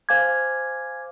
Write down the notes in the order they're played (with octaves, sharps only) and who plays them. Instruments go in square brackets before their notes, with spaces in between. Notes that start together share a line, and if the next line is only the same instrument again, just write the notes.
[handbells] C5 F5 G#5 D6 G#6